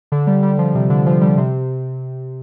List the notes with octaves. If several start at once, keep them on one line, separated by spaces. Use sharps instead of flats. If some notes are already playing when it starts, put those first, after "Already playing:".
D3
G3
G3
F3
C3
D3
F3
G3
C3